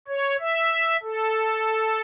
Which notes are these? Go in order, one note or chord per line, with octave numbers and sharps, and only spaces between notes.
C#5
E5
A4